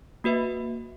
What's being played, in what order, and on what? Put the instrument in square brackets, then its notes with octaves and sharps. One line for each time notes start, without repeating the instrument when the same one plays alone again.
[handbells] A#3 F#4 B4 E5